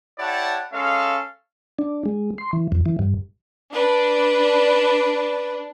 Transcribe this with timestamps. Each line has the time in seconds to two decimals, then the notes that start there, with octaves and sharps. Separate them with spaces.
0.19 E4 G4 C#5 D5 F#5 A5
0.73 G#3 C#4 A4 F5
1.79 D4
2.06 G#3
2.38 C6
2.53 E3
2.72 F2
2.86 E3
2.99 G2
3.73 D4 B4